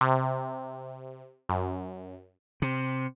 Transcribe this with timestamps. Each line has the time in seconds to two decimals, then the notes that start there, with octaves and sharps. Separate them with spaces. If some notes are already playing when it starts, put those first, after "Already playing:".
0.01 C3
1.49 F#2
2.62 C3